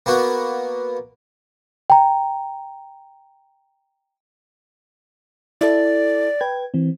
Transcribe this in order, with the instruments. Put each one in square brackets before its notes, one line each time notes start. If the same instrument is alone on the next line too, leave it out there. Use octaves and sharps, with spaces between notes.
[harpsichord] A#3 B3 F#4
[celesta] G5 A#5
[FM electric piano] E4 A4 [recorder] D5
[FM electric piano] B4 G5 G#6
E3 C4